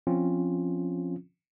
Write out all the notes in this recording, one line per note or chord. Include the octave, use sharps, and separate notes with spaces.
F3 C4 C#4 F4